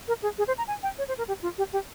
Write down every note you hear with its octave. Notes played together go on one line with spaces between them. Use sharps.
A#4
G#4
G#4
C5
A#5
G#5
G5
C#5
C5
A#4
G4
F4
G4
G4